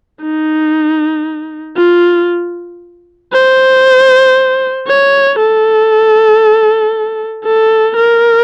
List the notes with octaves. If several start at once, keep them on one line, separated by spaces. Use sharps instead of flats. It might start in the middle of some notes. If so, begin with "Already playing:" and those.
D#4
F4
C5
C#5
A4
A4
A#4